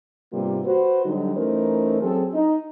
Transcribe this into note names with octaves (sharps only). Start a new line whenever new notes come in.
G#2 C3 G3 A#3 B3 F4
F#4 B4 C5
D3 F#3 G3 D#4
E3 A3 C#4 D#4 A#4 C5
F#3 C4 G#4 A4
D#4